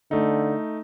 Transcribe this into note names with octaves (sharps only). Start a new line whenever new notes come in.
D3 A3 D#4